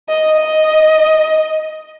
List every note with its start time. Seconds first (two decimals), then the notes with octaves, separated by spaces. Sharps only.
0.09 D#5
0.39 D#5